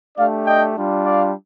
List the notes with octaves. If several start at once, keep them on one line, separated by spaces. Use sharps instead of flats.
A3 D4 G4 D5 F5
D#5 G5
G3 D4 F4
D5 F5